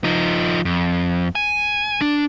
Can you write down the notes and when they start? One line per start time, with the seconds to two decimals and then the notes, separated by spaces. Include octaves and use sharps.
0.04 F3 D#4
0.65 F2
1.35 G#5
2.01 D4